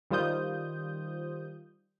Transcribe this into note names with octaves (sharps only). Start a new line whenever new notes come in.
D#3 G3 F4 C5 D#6 G6